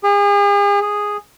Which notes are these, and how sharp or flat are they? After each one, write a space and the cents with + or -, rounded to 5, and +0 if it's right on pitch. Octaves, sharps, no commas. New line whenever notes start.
G#4 -40
G#4 -5